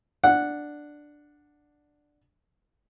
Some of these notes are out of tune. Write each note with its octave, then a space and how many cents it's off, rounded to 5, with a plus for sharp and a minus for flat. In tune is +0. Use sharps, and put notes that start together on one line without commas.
D4 +5 F#5 -5